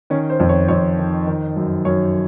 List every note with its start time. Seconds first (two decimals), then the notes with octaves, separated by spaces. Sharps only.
0.10 D#3 C#4
0.30 C5
0.40 F2
0.49 C#5
0.68 F2 C#5
0.98 D#3
1.27 D#3
1.56 F#2
1.85 F#2 C#5